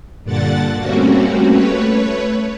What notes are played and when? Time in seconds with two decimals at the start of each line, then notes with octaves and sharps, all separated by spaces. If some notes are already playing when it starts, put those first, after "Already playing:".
0.24 G2 A#2 D3 D4 F#5 A6
0.78 G3 A3 A#3 C4 C#4 F#4
1.46 A3 B4 C#5